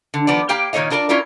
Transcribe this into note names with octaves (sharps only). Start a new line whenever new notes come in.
D3
D#3 F3 B3 D5
A#3 G4 F5 G5
A#2 D#3 D#4 C#5 D#5 F5
D4 F4 A#4 C5 D5
C#4 E4 F4 A#4 D5